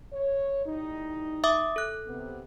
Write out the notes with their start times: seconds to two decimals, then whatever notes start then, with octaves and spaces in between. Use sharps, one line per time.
0.13 C#5
0.67 A2 G3 D#4
1.44 E5 D6 D#6
1.76 A4 F#6
2.07 C3 B3